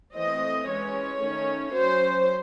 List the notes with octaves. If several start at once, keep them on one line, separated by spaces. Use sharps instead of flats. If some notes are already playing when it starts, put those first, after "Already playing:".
E3 A3 C4 D#5
E3 G#3 C#4 C#5
D#3 A3 C#4
F#3 C#4 C5